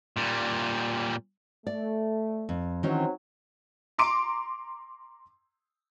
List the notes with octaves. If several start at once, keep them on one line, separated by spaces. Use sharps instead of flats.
A#2 G3
A3 D5
F2
D#3 E3 F#3 C4 C#4
A#5 C6 D6 D7